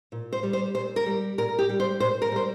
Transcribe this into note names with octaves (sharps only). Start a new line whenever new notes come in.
A#2
C5
G3
C5
A#2 C5
A#4
G3
A#2 A#4
G4
G3
C5
A#2 C5
A#4
G3 C5